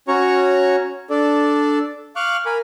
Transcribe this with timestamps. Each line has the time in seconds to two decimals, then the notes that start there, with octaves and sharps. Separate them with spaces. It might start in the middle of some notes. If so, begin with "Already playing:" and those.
0.08 C#4 F#4 C#5 A#5 C#6
1.10 D4 A4 D5
2.16 F5 C#6 D6 F6 F#6
2.46 A#4 G#5 B5